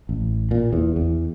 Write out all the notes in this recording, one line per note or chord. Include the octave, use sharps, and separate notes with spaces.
A1
A#2
E2
E2